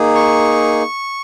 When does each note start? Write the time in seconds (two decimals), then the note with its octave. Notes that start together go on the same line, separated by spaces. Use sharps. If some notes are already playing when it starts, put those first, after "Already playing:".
Already playing: A#3 D#4 G#4
0.15 C#6